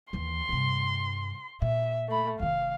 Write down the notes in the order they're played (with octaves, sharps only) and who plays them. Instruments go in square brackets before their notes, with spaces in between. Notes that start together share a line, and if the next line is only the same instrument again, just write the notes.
[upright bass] D#2 E3 [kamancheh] C6
[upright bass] G2 C3
[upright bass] A#2 [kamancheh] E5
[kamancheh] A3 B5
[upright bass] F1 D#3 [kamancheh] F5